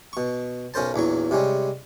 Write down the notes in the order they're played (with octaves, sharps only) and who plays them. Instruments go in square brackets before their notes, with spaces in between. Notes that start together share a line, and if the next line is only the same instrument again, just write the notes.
[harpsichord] B2 C#6
B1 C#4 A#4 C5 A5
A#1 E2 F#3 C#6
C3 G3 G#3 C#4